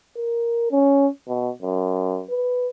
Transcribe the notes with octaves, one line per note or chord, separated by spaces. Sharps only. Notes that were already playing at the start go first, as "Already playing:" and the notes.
A#4
C#4
B2
F#2
B4